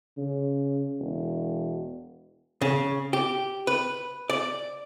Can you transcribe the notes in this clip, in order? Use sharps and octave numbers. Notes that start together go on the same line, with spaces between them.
C#3
E1
C#3
G4
B4
D5